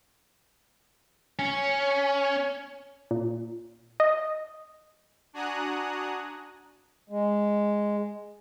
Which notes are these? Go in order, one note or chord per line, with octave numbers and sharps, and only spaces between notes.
C#4
A#2
D#5
D4 F#4 G#5 A#5 D#6 F#6
G#3